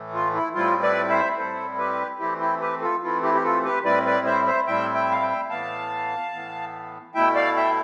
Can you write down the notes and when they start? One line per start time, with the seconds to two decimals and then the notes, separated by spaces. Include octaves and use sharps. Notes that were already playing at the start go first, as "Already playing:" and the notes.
Already playing: A2 E3 A3
0.14 F4
0.34 E4
0.54 A2 G3 C4 E4 F4
0.82 B4 D5
1.09 C5 E5
1.37 A2 G3 C4 E4 A4 C5
1.78 G4 B4
2.19 E3 A3 C4 E4 G4
2.40 E4 G4
2.61 G4 B4
2.81 F4 A4
3.02 E3 A3 C4 E4 F4
3.23 E4 G4
3.35 G4
3.44 F4 A4
3.65 G4 B4
3.84 A2 G3 C4 E4 B4 D5
4.06 B4 D5
4.26 C5 E5
4.46 C5 E5
4.67 A2 G3 C4 E4 E5 G5
4.94 E5 G5
5.12 F5
5.22 E5 G5
5.49 A2 E3 B3 F5 A5
6.33 A2 E3 B3
7.14 B2 A3 E4 E5 G5
7.35 D5 F5
7.56 E5 G5